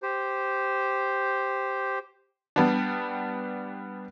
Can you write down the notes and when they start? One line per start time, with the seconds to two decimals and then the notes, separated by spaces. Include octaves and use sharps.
0.02 G4 C5
2.56 G3 B3 D4